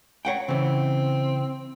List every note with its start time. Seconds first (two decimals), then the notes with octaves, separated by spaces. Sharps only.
0.25 C#5 F#5 G5
0.48 C#3 E3 C4